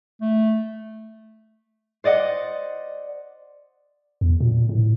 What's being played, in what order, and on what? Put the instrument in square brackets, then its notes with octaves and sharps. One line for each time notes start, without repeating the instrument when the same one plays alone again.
[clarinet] A3
[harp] C5 D5 D#5 F#5
[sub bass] E2
A#2
A2